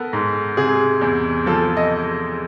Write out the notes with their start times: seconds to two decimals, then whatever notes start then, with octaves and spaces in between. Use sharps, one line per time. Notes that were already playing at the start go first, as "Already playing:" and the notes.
Already playing: B3 A4 A#4
0.13 G#2
0.57 C3 G#4
1.01 E2
1.46 F3 A4
1.77 D#5